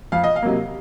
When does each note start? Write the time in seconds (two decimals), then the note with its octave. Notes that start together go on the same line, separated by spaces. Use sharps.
0.12 F2 F5
0.24 D#5
0.36 F5
0.42 C3 F#3 A#3